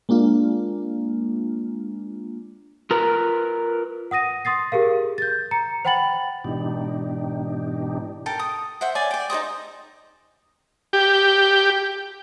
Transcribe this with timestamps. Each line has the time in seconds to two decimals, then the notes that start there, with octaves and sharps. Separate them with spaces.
0.09 G#3 A#3 D4 F4
2.91 F4 A#4 B4 A#5
4.11 F#5 D#6 A#6 D#7
4.45 C6 D#6 A6 C7
4.72 G4 G#4 A#4 F5
5.18 G6 A6
5.51 A#5 C#7
5.85 C5 F#5 G5 B5 A6 F#7
6.44 G#2 B2 E3 D4 D#4 G4
8.26 A4 A#4 G5
8.39 D#6
8.81 C5 E5 F#5
8.95 C#5 D5 G#5
9.11 D5 G5
9.30 D#4 A4 C5 D#6
10.93 G4